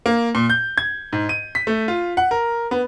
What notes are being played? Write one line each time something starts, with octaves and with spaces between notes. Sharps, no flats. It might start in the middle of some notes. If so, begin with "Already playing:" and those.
A#3
A#2
G6
G#6
G#2
D#7
B6
A3
F4
F#5
A#4
B3